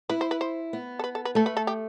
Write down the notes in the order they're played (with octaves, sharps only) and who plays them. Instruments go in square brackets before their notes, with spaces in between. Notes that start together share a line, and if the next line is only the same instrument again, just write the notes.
[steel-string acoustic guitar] E4 [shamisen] B4
[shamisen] C5
B4
C5
[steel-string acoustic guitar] B3
[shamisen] A4
B4
A4
B4
[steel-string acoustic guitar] A3 [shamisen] A4
[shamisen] B4
A4
G4